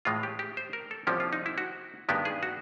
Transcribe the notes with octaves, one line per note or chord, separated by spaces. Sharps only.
A2 E3 G#3 F4
G4
G4
C5
A#4
A4
C2 C3 F3 A#3 C#4 G4
F4
D#4
E4
F#4
G2 D#3 G#3 B3 G4
G#4
F#4